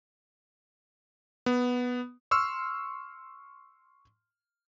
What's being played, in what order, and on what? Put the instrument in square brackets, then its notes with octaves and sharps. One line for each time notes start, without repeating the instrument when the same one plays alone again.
[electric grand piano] B3
C6 C#6 E6 F6